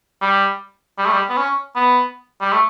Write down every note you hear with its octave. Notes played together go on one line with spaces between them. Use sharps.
G3
G3
A3
G3
B3
C#4
B3
G3
A3